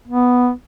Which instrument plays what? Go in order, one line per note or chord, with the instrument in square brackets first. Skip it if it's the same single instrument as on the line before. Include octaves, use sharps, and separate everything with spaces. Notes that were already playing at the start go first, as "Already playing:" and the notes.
[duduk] B3